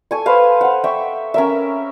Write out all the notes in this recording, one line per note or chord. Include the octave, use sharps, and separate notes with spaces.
A4 G#5 C#6
B4 C5 F5
C5 F#5
E5 G5 C#6
C#4 A#4 E5